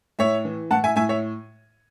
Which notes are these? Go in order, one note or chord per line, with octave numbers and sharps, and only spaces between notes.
A2 C#5 E5
E3
A2 F#5 A5
E5 G#5
A2 E5 G#5
C#5 E5